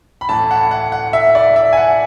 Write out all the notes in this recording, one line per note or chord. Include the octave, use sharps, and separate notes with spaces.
B5
A2 E3 A5
F#5
F#5
F#5
E5
D5
E5
G#5
F#5